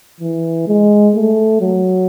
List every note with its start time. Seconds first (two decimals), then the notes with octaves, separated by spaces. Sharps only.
0.20 E3
0.67 G#3
1.15 A3
1.61 F#3